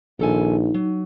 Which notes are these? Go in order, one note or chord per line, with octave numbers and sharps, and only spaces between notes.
A#1 D#3 D#4 A4 G#5
F#3